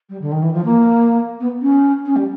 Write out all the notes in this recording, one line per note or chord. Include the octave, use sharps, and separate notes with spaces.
G3
D3
D#3
E3
F3
A#3
B3
C#4
C#4
G3